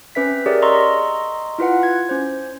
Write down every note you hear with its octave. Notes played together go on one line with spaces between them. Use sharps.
C4 C#4 B4 E5 B6
G4 G#4 A#4 C#5 D5 E5
D#5 A#5 C6 C#6 E6
E4 F4 B4 F#5
G#6
C#4 C5